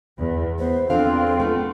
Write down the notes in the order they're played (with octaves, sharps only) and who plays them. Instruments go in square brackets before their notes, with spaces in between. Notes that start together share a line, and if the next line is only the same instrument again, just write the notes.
[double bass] E2 B3
[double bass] B3 [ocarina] C5
[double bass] E2 C4 [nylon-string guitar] F3 D4 F5 [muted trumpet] F4 [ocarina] A4
[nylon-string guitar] A3 B3